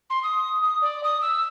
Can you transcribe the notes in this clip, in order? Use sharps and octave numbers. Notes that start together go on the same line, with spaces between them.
C6
D#6
D#6
D5
D#6
E6